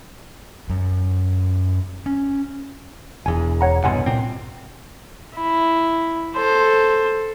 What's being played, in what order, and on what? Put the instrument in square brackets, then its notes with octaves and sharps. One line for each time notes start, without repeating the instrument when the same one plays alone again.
[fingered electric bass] F#2
C#4
[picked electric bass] E1 E2 [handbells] G#5
[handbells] C#5 F#5 A#5
[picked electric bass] C2 G2 B2 [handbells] F#5 G#5 C6
[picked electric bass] C2 A#2 C4
[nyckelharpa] E4
A4 C5